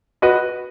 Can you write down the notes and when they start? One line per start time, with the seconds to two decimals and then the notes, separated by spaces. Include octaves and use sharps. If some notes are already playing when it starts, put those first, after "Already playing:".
0.22 F#4 B4 D#5